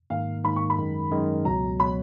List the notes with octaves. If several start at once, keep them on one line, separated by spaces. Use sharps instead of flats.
G#2 D#3 A#3 F5
G#2 D#3 A#3 B5
C#6
B5
F#2 D#3 G#3
F#2 D#3 G#3
C#2 B2 F#3 A#5
B2 F#3 B5